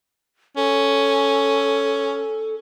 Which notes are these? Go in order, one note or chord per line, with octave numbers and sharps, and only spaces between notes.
C#4 A4